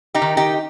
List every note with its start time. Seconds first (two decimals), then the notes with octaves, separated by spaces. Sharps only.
0.14 D#4 G4
0.22 D#3
0.37 D#4 G4